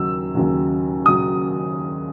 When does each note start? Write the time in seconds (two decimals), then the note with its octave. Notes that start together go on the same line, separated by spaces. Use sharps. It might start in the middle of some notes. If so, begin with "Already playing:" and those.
Already playing: D#2 C#3 F#3 E6
0.35 D#2 C#3 F#3
1.06 C#3 F#3 D#6